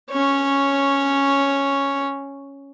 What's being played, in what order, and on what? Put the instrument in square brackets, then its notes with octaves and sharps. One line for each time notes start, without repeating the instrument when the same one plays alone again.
[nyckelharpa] C#4 C#5